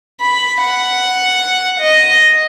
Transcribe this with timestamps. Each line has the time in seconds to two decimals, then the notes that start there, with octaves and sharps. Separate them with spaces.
0.21 B5
0.61 F#5
1.80 D#5